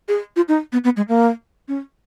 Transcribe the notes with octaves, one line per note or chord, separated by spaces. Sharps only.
G#4
F4
D#4
B3
B3
G#3
A#3
C#4